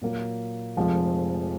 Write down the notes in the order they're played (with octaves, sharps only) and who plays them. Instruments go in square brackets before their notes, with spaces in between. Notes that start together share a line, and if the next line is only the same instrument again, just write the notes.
[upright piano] A#2 F#3 A#3
F1 F2 F3 G#3